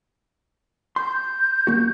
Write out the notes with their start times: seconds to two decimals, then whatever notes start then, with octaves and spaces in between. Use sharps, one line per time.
0.96 C6 G6
1.67 A#3 F#4